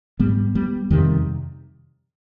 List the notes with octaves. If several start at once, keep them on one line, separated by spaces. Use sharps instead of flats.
G#2 G3 B3
G3 B3
F2 C3 D#3 G3